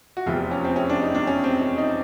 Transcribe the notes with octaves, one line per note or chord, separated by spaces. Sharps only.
F#4
F1 E2 C3 F3 F4
F4
C#4
C4
C#4
D4
D#4
D4
C#4
C4
C#4
D#4